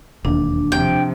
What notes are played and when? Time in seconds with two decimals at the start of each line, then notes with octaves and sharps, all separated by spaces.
0.25 E1 D#2 D4
0.72 C3 F3 G5